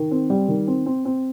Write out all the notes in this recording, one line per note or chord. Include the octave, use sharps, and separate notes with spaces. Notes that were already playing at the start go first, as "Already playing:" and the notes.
Already playing: D#3
C4
G3
D#3
C4
C4
C4